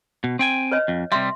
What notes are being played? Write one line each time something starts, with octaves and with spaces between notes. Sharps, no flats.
B2
C4 G5 G#5
B4 C#5 D#5
F2
C3 G3 E5 C6